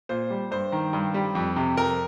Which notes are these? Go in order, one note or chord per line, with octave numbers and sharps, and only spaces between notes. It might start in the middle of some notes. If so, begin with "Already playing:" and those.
A#2 C5
G3
G2 C5
D#3
G2
G3
F2
C3
F2 A#4